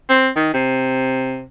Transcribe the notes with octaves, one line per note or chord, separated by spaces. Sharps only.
C4
D#3
C3